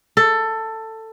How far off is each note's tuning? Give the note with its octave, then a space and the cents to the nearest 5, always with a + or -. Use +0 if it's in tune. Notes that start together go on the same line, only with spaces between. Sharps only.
A4 +15